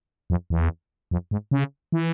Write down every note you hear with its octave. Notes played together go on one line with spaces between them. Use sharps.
F2
E2
F2
G#2
C#3
E3